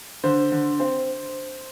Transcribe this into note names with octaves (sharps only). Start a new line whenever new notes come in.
D3 C5
D3
C4